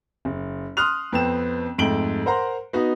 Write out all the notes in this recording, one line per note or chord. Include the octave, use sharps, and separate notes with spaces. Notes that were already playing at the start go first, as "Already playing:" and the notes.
F#1
C6 D#6 F6 F#6 F7
F2 B3 C4 E7
F2 G#2 A3 D7 F#7 G7
A#4 C5 F#5 A#5 C6
B3 D#4 F#4 D#5